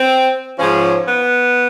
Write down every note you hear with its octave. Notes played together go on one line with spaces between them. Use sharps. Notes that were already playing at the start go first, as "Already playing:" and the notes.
Already playing: C4
G#2 F3 C#4
B3